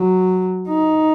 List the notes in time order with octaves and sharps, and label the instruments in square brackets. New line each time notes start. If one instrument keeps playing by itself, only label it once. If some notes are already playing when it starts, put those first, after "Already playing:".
Already playing: [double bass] F#3
D#4